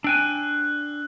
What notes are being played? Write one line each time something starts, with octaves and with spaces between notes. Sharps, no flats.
D4 G5 G#5 E6 F#6